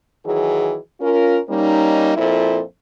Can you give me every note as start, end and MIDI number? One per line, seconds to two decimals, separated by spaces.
0.25 0.77 51
0.25 0.77 52
0.25 0.77 54
0.25 0.77 68
1.00 1.38 61
1.00 1.38 65
1.00 1.38 70
1.49 2.13 55
1.49 2.13 58
1.49 2.13 61
1.49 2.13 63
2.16 2.60 41
2.16 2.60 46
2.16 2.60 64
2.16 2.60 65
2.16 2.60 69
2.16 2.60 72